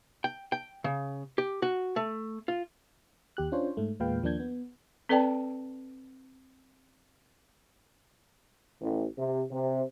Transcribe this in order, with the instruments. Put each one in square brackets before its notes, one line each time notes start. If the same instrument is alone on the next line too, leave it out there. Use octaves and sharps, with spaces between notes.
[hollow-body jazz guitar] G5
G5
C#3
G4
F#4
A3
F4
[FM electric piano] D#2 G4 F#6
C#4 D4 F4 C5 C#5
G#2 A3
E2 A#2 G#3 B4 F5 G5
D#2 F3 A#3 D4 G6 G#6
B3
[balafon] C4 A4 B4 D5 G5 A5
[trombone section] A1
C3
C3